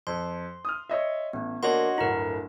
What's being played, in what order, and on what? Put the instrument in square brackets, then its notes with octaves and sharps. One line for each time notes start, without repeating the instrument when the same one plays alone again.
[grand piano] F2 [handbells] C6
[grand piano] D#6 F6
C#5 D#5 E5
[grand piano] A1 [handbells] B3
[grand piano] D3 A#3 D4 [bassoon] F#4 [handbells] C#5 D#5 C6
[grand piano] D1 G1 A#5 [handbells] E4 A#4